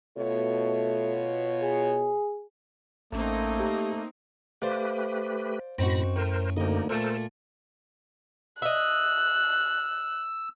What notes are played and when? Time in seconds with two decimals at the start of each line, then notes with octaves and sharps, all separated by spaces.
0.17 B2 A3 F4 C#5
1.63 G#4
3.13 A1 A3 A#3 C4 C#4 D#4
3.60 G4
4.62 A3 G4 B4 C5 D5 F5
5.78 F#2 A2 C4 D#4 F#4 B5 A#6
6.16 A2 A#4 C5
6.57 D2 D3 A#3 D#4 D#5
6.89 A#2 A3 A4 A#4 C5 A5
8.62 D#5 E5 E6 F#6